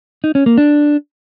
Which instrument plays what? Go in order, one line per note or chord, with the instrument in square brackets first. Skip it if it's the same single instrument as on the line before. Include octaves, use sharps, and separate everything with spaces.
[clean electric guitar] D#4
C#4
A#3
D4